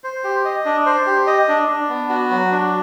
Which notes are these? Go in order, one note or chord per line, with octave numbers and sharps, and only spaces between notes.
C5
G4
D#5
D4
C5
G4
D#5
D4
D4
B3
F#4
F#3
D4